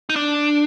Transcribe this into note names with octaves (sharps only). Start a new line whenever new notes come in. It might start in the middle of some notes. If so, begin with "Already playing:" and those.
D#4
D4